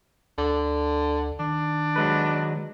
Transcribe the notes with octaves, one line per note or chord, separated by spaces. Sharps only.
D2 D3
D#3 D4
F#3 G#3 B4